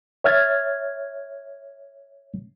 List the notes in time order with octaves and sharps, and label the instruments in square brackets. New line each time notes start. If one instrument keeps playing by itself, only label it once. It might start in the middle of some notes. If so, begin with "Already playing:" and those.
[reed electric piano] C#5 E5 F6 G#6 A6